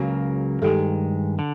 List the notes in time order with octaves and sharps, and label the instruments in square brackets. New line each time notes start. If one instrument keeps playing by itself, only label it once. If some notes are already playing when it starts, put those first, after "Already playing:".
Already playing: [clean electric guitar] C#2 C#3 F#3 A#3 [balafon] F#4 G#4
[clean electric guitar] G2 D#3 G#3 [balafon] G4 A4
[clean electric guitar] D3